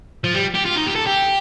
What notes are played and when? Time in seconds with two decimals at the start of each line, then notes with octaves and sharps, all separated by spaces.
0.24 F3
0.34 G3
0.54 G4
0.65 F4
0.75 D#4
0.86 G4
0.95 A4
1.07 G4